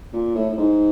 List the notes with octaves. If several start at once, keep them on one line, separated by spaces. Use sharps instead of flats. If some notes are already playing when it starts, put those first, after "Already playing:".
A#2
A2
A2
G#2